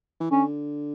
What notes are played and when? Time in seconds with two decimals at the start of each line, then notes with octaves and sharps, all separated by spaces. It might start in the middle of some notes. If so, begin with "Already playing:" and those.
0.20 E3
0.31 D3 C#4